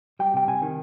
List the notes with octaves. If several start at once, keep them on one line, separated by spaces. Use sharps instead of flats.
G3 G5
C3 G5
C3 G#5
D#3